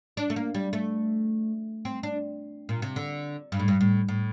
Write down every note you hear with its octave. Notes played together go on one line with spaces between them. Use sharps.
D4
A3
A#3
G3
A3
C4
D4
A#2
C3
D3
G2
A2
G2
A2
A2